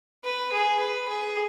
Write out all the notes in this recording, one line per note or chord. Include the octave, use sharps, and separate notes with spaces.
B4
G#4
B4
G#4